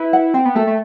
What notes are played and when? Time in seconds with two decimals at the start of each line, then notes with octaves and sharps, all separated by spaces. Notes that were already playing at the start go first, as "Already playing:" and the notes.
Already playing: E4 B4
0.13 F#5
0.34 C4 G5
0.45 B3
0.55 A3 A4
0.67 A3